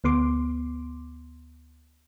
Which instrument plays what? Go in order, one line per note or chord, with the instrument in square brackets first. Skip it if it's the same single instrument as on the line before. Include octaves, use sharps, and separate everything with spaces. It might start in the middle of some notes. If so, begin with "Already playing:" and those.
[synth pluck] D2 B3 C6 D6